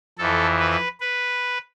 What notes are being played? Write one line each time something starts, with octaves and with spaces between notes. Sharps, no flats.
F2 E3 A4
B4
B4